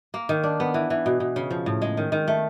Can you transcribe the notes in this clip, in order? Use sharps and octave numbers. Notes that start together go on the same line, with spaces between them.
A#3
D#3
D4
B3
E3
E3
B2
B2
C#3
F3
A2
G#3
D#3
D#3
A3